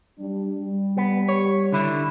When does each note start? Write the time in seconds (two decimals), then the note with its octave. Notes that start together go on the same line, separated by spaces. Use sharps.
0.18 G3 D4
0.59 G3
0.98 B3
1.29 C#5
1.72 D3 E4